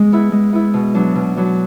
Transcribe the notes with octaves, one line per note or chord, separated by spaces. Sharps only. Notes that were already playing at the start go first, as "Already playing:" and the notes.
Already playing: G#3
B3 E4
G#3
B3 E4
B2
F#3 B3 D4
B2
F#3 B3 D4